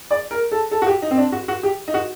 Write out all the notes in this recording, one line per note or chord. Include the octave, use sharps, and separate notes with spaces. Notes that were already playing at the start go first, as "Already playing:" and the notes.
D5
A#4
A4
A4
F#4
G4
D#4
C4
D4
F#4
F#4
G4
D#4
F#4